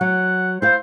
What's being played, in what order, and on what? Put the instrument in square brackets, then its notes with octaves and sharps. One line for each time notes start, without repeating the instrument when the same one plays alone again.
[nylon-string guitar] F#3 [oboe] F#5
[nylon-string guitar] E4 F5 [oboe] C5